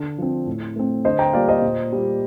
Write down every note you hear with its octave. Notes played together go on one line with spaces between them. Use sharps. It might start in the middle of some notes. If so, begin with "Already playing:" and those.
Already playing: D3
F3 C4
A2
A3 C4
D3 C5 D#5
G5 A#5
G3 A#3 F4 D5 F5
C5 D#5
A#2
G3 A#3 F4